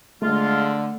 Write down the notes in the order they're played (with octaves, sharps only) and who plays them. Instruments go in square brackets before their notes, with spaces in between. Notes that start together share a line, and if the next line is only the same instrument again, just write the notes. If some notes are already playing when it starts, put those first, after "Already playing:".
[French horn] D3 [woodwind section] G#3 F4 [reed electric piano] A3